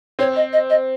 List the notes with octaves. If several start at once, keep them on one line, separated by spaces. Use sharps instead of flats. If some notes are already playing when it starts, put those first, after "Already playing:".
C4 C#5
D#5
D#5
D#5